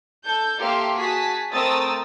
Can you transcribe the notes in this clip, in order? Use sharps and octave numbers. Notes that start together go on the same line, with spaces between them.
A4 G6
A#3 G4 A4 E5 F5 C6
F#4 G#4 G#5 A5 B6
A3 C4 A#4 D#6 E6 A6